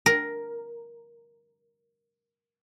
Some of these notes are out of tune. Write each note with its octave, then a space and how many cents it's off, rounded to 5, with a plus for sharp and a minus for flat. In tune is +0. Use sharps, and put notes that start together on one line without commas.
A#4 +5